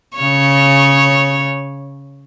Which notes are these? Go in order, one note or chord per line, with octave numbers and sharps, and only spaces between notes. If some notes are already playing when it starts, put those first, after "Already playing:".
C#3 C#5